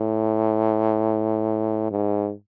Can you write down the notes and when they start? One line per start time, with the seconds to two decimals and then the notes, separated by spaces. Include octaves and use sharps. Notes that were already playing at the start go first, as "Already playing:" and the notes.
Already playing: A2
1.91 G#2